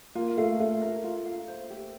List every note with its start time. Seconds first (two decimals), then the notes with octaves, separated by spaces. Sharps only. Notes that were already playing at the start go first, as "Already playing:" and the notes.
0.15 A#3 F4
0.37 A3 F5
0.59 A3 F4
0.82 A#4
1.04 F4
1.26 F5
1.48 C5
1.70 G4